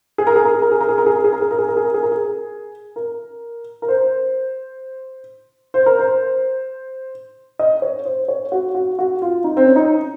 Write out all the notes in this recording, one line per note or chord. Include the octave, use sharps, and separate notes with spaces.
G#4
A#4
G#4
A#4
G#4
A#4
G#4
A#4
G#4
A#4
G#4
A#4
G#4
A#4
G#4
A#4
G#4
A#4
G#4
A#4
G#4
A#4
G#4
A#4
A#4
C5
C5
A#4
C5
D#5
C#5
C5
C#5
F#4
F#4
F#4
F4
D#4
C4
C#4
D#4